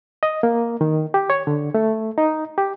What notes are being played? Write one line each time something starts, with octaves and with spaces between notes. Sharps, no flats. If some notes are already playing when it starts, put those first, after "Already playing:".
D#5
A#3
D#3
G4
C#5
D3
A3
D#4
G4